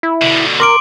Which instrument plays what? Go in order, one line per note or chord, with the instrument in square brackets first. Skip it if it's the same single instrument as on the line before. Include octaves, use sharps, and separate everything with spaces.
[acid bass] E4
[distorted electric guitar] B2 D3
[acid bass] A#4 [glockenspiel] C6 D6 D7